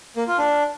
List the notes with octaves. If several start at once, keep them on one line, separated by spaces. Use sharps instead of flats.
A#3
F4
D4